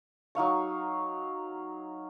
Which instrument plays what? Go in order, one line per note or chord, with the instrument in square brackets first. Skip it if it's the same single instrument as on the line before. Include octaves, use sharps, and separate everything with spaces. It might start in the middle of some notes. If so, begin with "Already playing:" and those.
[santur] F#3 D#4 F5 C#6